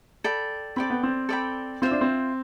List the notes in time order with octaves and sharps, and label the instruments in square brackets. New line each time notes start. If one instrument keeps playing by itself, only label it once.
[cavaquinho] A4 D5 G5 B5
[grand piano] C4 [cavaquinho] A4 D5 G5 B5
[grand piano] B3
C4
[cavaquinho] A4 D5 G5 B5
[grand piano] C4 [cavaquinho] F4 C5 E5
[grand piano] D4
C4